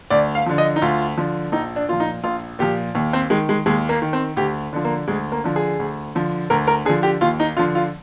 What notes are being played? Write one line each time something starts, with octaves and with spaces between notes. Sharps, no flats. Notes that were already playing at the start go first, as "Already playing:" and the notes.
D2 D5
F5
D3 F3
D#5
D#4
D2 F4
D3 F3
A#1 D#4
D4
A#2 F3 F4
D#4
A#1 F4
A#2 F3 G4
D#2
C4
D#3 G#3
G#3
D#2 G#3
A#3
D#3
C4
D2 G4
D3 F3
A#3
D2 G#3
A#3
D3 F3
G#4
D2
D3 F3
D2 A#4
A#4
D3 F3 G#4
G4
D#2 F4
D#4
D3 F3 F4
F4